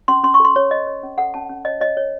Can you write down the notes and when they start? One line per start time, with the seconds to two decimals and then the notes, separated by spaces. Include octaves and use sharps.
0.08 C#4 C6
0.24 C#4 C6
0.34 C#6
0.40 A4 C6
0.56 C#5
0.71 C#5 D#5
0.87 C#5
1.03 C#4
1.18 A4 F#5
1.34 C#4 A5
1.50 C#4
1.65 C#5 D#5
1.81 C#5 D#5
1.97 C#5